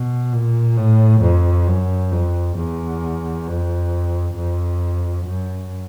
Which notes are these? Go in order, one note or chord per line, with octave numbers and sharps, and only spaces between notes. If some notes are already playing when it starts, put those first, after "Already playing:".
Already playing: B2
A#2
A2
F2
F#2
F2
E2
F2
F2
F#2